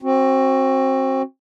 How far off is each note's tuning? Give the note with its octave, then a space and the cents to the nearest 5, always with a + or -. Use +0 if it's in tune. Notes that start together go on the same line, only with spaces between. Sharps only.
C4 +25 F#4 +0